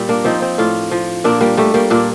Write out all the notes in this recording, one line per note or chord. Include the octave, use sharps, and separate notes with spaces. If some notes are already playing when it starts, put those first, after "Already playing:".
Already playing: A#2 G3
A#3 D4
F3 C4 D#4
C4 D#4
A2 D4 F4
F3
A#2 A#3 D4
G3 A#3
G3 A3
G3 A#3
A#2 A#3 D4